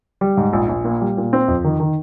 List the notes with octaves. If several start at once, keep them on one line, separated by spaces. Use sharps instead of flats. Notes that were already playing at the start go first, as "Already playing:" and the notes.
G3
G#2
A#1
A#1
A#2
G3
A#2
C4
F2
D#3
D#3